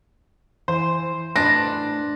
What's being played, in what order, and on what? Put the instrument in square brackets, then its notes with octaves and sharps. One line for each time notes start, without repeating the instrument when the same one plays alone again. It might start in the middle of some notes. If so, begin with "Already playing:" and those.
[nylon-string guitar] E3 [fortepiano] C5
[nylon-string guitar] A2 B4 [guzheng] D4 [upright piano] A#6